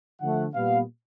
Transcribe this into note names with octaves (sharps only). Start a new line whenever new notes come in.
D3 F3 A3 F#5
A#2 G3 B3 F5